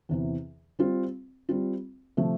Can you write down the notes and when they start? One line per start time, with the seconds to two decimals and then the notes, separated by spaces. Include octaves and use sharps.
0.09 E2 C3 E3
0.79 G3 C4 F4
1.49 G3 C4 F4
2.17 C3 F3 A3